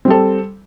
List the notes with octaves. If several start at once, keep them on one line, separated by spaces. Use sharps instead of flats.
G3 C4 A4